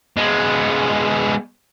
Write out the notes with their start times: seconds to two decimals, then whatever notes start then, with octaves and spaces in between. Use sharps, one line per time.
0.17 G#3 B3